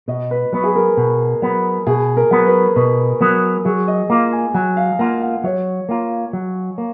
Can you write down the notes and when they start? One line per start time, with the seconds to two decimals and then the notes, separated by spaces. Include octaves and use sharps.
0.08 B2 D#5
0.31 B4
0.52 F#3 B3 B4
0.64 G#4
0.76 A#4
0.97 B2
1.42 F#3 B3
1.87 B2 G#4
2.17 A#4
2.31 F#3 B3
2.46 B4
2.76 B2 B4
3.21 F#3 B3 A#4
3.65 F#3 G#4
3.88 D#5
4.10 A#3 F4
4.32 G#5
4.54 F#3 G#5
4.77 F5
4.99 A#3 F4 F#5
5.22 F#5
5.44 F#3 C#5
5.89 A#3 F4
6.33 F#3
6.78 A#3